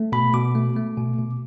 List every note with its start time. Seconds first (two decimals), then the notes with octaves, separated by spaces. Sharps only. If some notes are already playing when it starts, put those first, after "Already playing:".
Already playing: A3
0.12 B2 B5
0.34 B2 D6
0.55 A3
0.76 A3
0.97 B2
1.19 B2